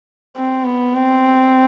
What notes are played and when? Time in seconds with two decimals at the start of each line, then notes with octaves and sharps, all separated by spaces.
0.37 C4
0.65 B3
0.95 C4